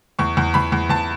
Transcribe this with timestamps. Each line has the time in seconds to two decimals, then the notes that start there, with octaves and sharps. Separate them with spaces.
0.19 E2 C#6
0.37 E2
0.54 E2 B5
0.72 E2
0.89 E2 A5